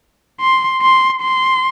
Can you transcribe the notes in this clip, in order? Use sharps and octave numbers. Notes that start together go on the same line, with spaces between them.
C6
C6
C6